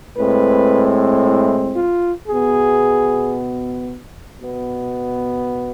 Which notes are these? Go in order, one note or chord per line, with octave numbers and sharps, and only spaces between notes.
A2 G#3 C4 B4
E4
F4
B2 B3 G#4
B2 B3